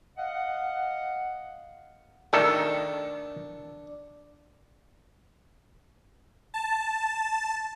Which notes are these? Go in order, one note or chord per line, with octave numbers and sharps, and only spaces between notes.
D#5 F5 F#5
D#3 A3 D4 A4
A5